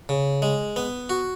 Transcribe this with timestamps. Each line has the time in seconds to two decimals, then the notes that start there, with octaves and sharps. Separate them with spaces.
0.09 C#3
0.42 G#3
0.76 B3
1.09 F#4